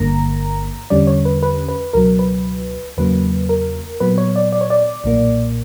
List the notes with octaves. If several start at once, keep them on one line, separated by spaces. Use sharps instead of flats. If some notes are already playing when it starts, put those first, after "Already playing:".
Already playing: G1 G2 D3 A#3 A#5
E2 D3 G3 C#4 D5
C#5
B4
B4
B4
C#2 B2 F#3 A#4
B4
E2 C#3 F#3 A#3 B4
A#4
A#2 F#3 B3 B4
C#5
D5
D5
C#5
D5
B1 A#2 A#3